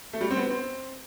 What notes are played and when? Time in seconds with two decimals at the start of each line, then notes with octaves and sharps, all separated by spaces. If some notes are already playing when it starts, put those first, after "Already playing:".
0.13 A3
0.21 G3
0.31 C4
0.36 B3
0.50 C4